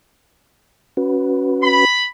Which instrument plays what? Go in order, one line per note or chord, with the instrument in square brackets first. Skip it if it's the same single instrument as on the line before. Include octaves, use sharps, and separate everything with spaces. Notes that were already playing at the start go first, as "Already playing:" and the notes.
[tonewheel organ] C#4 F#4 B4
[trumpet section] B5